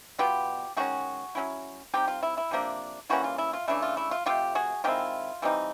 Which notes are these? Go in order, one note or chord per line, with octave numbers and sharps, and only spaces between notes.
B2 F#3 B3 F4 G4
D#3 G#3 C#4 F#4 G#4
F#3 A#3 C#4 E4
G3 C4 D#4 F4 G4
F4
E4
E4
C3 F3 A#3 D4
E3 G3 A#3 C#4 E4 F#4
F4
E4
F4
C#3 E3 A3 D4 E4
F4
E4
F4
C3 F3 A3 F4 G4
F#4 G#4
D#3 G#3 C4 E4 F4 G4
E3 G3 C4 D#4